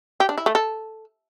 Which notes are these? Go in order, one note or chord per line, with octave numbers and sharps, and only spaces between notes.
G4
D4
E4
A3
A4